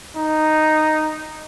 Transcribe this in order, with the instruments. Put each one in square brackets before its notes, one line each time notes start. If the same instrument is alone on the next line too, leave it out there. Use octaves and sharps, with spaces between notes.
[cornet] D#4